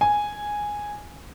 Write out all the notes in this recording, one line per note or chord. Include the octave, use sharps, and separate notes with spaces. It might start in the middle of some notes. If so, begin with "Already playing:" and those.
G#5